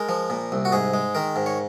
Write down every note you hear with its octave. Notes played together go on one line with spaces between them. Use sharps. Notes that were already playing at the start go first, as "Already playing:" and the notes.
Already playing: G#3 A#4
F3
A#2
C2
F#4
G#2 G#4
G#3
D#3 A#4
G#2
C#5